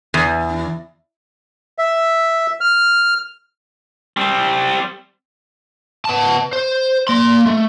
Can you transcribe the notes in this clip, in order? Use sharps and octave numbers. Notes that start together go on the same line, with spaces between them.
E2
E5
F6
G3 C4
B3 A5
C5
A#3 C6
A3